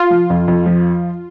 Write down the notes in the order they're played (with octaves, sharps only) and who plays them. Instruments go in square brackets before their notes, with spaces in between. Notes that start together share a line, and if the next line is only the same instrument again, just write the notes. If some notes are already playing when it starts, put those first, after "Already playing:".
Already playing: [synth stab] F4
[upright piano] F3
F2
F2
F3